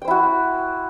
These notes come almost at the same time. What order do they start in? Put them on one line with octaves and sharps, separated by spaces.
G5 C5 E4 F#4